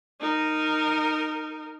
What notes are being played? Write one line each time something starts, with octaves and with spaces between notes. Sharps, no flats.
D#4 A#4